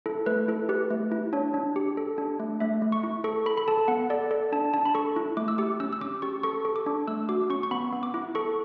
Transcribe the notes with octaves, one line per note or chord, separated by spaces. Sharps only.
E4 A4
A3 B4
E4 A4
G4 B4
A3
E4
D4 C#5
D4
G4
A4
D4
A3
A3 E5
A3
C#6
E4
A4 C#6
A4 B5
B5
A4 A5
B3 F#5
A4 D5
A4 D5
D4 A5
D4 A5
B5
A4 C#6
E4
A3 D6
E6
G4 D6
C#4 E6
E6
C#4 D6
G4 C#6
A4 C#6
A4
D6
D4
A3 E6
F#4 D6
C#4 C#6
C#6
B3 B5
B3
D6
E4
A4 C#6